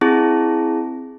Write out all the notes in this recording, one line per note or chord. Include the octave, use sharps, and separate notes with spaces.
C4 E4 G#4 A5